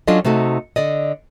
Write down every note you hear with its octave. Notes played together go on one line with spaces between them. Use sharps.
F#3 C#4 D4 F4 A4 D#5
C3 A3 D#4 F#4 A4
D3 D5 D#5